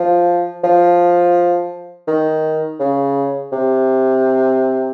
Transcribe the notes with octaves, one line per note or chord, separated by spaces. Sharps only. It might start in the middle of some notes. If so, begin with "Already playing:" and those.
Already playing: F3
F3
D#3
C#3
C3